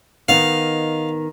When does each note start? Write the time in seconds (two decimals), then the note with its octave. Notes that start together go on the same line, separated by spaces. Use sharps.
0.29 D#3 B3 D#4 F5